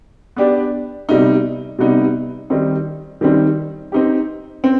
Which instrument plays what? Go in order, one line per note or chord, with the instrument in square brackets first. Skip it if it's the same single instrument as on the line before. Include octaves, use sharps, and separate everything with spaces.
[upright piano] B3 D4 G4 D5
C3 G3 B3 D#4
C3 G3 B3 D#4
D#3 G3 C4 D#4
D#3 G3 C4 D#4
C4 D#4 G4
C4